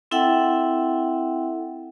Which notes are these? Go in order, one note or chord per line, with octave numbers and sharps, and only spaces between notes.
C4 E4 A4 E5 F#5 G5